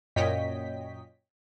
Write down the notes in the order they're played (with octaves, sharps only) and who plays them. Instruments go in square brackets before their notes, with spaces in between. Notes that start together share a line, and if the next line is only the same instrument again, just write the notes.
[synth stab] F#2 A#2 C#5 D#5 G5 B6